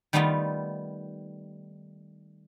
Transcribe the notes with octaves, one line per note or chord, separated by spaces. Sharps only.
D#3 G3 A3 B3 D#4 F4